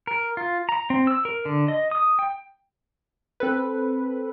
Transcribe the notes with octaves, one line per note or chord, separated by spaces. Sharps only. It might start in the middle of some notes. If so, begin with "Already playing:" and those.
A#4
F4
A#5
C4
E6
A#4
D3
D#5
D#6
G5
C4 A4 B4